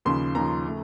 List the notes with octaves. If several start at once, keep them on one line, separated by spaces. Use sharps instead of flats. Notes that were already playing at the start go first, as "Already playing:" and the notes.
D#2 C#3 F3 C6
D#2 C#3 F3 A#5
C#3 A3